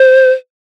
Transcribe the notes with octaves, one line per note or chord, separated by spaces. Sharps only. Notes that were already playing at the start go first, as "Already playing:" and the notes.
Already playing: C5